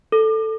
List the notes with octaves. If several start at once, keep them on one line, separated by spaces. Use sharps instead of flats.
A4